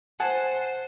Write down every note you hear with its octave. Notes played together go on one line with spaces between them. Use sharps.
C5 F#5 G#5 A5